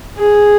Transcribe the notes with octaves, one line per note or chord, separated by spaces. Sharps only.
G#4